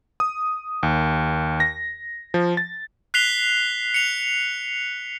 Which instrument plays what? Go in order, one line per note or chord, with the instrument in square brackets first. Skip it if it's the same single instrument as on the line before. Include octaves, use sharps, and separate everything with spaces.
[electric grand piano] D#6
D#2
A#6
F3
A6
[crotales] F#6 B6 C7 F7 G7
C#7 F7